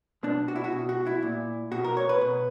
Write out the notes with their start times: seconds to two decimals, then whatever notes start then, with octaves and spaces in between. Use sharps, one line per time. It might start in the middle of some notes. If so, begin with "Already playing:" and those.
0.23 B2 D4
0.48 F#4
0.56 E4
0.64 F#4
0.72 B2
0.89 F#4
1.06 E4
1.23 A#2
1.72 B2 F#4
1.84 A#4
1.97 C#5
2.09 B4
2.21 B2